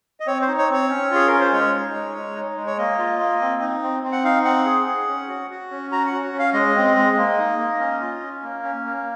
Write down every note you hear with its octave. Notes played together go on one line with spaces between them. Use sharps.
D#5
C4 C#5
C5
D#4
C#5
C4 C#5
C#4
F4 G#4
C#4 A#4
C5
G#3 C#5
D#4
G#3
G#3
D#4
G#3
C#5
A#3 D#5
F4
A#3
C4
D#4
C4
C4
F#5
D#4 F5
C4 F#5
G#4
G#4
C#4
F#4
F#4
C#4
F#4 A#5
F#5
F#4
C#4
F5
G#3 D#5
C4
G#3
A#3
D#4
A#3
C#4
F4
C#4
A#3
C#4
A#3